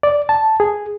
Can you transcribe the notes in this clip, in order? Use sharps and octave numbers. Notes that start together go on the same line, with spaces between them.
D5
A5
G#4